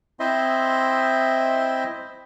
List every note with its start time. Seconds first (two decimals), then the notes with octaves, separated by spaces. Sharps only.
0.20 C4 E4 C5 D#5 E5 C6